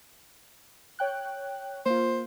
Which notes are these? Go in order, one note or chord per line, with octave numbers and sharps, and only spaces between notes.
C#5 G5 F#6
A#3 F4 C5